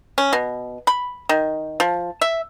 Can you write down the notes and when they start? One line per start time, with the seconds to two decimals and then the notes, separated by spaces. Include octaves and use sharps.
0.18 C#4
0.33 B2
0.87 B5
1.29 D#3
1.80 F3
2.21 E5